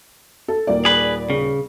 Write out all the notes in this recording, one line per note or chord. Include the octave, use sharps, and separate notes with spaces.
A4
D#1 A#3 D5
G#4 B4
C#3